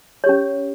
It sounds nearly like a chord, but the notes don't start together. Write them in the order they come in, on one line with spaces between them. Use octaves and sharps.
C#5 G4 C#4